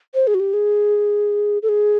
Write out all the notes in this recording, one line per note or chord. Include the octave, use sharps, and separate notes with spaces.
C5
G#4
F#4
G4
G#4
A4
G#4